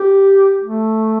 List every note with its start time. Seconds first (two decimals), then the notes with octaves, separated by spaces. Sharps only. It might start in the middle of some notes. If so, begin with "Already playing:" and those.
Already playing: G4
0.61 A3